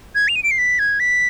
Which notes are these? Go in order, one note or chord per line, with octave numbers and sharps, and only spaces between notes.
G#6
F7
D#7
D7
C7
B6
G#6
B6